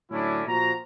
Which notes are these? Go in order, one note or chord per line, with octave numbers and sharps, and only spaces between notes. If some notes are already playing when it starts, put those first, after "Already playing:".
A2 D3 F#3 C#4 D4 E4
A#2 F3 F#4 A#5